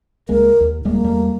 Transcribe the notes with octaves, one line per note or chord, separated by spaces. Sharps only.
C#2 G#3 A#3 A#4
D#2
D1 G3 G#3 A#3
E2 G3 A3